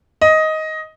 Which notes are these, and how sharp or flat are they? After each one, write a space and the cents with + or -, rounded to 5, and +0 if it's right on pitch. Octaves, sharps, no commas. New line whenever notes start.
D#5 +10